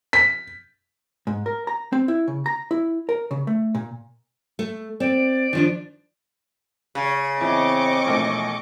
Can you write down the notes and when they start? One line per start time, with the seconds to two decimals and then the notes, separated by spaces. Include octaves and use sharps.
0.13 B6
1.27 G#2
1.46 A#4
1.67 A#5
1.93 C4
2.08 E4
2.28 C#3
2.46 A#5
2.71 E4
3.09 A#4
3.31 C#3
3.47 A3
3.75 A#2
4.59 A3
5.00 C4 D5
5.53 D#3 F3 D4
6.95 C#3
7.41 E2 C4 E4 D#5 C#6 D6
8.06 E1 A#1 A3